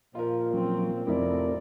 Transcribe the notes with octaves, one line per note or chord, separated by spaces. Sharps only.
A#2 F3 F4 A#4
F3 F#3 C4 C#4
F1 A2 A3 C4 E4 F4 A#4 D5